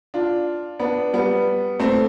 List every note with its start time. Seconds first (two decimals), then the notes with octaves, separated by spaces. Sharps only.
0.14 D4 F4
0.80 B3 D4
1.13 G3 B3
1.79 A3 C4